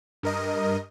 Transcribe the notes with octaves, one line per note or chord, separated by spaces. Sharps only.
G2 A#4 D#5